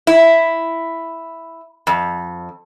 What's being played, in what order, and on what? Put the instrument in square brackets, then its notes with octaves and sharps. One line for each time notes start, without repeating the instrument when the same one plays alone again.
[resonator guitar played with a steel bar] E4
F2